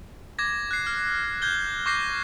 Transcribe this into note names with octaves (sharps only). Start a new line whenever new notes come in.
D6 G#6 A#6
F#6 C7
F6
G6 G#6 G7
C#6 D6 G6 A#6 C7